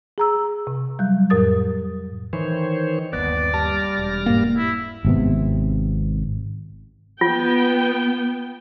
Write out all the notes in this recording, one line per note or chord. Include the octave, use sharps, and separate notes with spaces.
G#4 A#5 E6
C3
F#3 G3
F2 A2 A#4 D#6 A6
D#3 E3 C5 C#5
G1 D#2 B3 D5 F#6 A#6
G3 A5 F6 A#6
E1
G#2 A#3
E4
G#1 C3 B3
B3 F4 G5